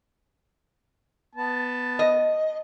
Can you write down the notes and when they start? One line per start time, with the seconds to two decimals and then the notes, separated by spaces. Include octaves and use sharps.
1.35 B3 A5
1.99 D#5